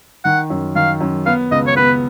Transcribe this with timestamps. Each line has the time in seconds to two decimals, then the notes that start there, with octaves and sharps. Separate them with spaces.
0.25 D#3 F#5
0.50 F#2
0.76 D#3 F5
1.01 F#2
1.26 B3 F5
1.51 C#2 D#5
1.67 C#5
1.76 B3 B4